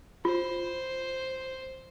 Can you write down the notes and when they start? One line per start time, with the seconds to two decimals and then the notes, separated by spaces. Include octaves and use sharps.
0.25 F4 C5